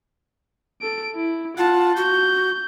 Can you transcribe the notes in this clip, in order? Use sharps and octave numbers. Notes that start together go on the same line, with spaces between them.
A4 D7
E4
F4 F#5 A5
F#4 G6